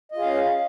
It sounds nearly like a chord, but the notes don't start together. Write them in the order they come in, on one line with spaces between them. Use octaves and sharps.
D#5 F4 G#4 F5 C#4